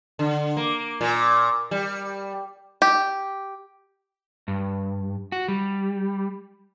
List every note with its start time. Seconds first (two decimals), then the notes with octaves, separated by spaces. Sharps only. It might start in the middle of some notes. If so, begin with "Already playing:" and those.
0.19 D3
0.57 A#3
1.01 A#2
1.71 G3
2.82 G4
4.48 G2
5.32 F#4
5.48 G3